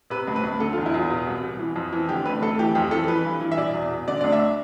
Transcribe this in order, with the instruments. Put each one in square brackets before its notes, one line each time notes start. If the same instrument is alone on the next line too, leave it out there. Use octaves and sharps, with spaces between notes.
[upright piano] C3 B4
D2
B4
D2
D3 A4
F4
E2
E4
E2 F4
B2
C2
B2
E3
F2
E3
D3 G4
D2 B4
D2 A4
E3 G4
F2 G4
E3 A4
E3 B4
G2
E3
E5
B2 D5
E2
B2
D3 D5
D2 D5
E5